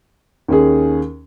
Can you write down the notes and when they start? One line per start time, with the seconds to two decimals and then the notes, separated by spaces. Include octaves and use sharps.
0.48 D#2 C#4 G#4